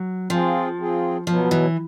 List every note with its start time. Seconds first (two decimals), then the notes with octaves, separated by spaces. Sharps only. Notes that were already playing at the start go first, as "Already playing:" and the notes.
Already playing: F#3
0.30 F3 C4 F4 G#4
0.78 C4 F4 G#4
1.27 B2 F3 F#3 B3
1.51 E3